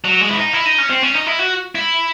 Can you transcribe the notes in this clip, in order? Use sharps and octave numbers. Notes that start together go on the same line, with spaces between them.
F#3
G#3
E4
D#4
E4
D#4
C#4
C4
C#4
D#4
E4
F#4
E4